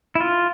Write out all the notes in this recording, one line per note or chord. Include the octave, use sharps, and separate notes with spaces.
E4
F4